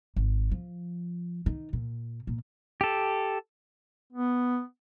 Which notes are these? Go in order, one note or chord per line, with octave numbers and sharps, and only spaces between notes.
G#1
F3
D#3
A#2
A#2
G4 A4
B3